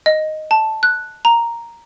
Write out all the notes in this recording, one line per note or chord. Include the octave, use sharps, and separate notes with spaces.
D#5
A5
F#6
A#5